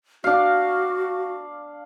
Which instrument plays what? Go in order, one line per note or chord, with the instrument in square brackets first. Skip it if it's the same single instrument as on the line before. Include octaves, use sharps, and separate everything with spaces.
[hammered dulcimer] D4 F5 [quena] F#4